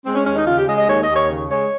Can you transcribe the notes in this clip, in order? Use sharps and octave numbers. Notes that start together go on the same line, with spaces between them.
G#3 C4
C#4
D#2 C#4
D#4
C#3 F4
G4
G#3 D#5
D#5
D#2 C#5
D#5
D#2
C#5
C#3
G#3 C#5